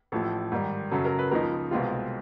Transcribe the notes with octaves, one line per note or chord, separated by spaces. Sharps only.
A1 A2 F3 A4
G#2 D#3 G3
F#2 C#3 F#3 A4
A#4
B4
C#2 C#3 F3 A#3 D#4 A#4
C2 B2 G#3 C4 F4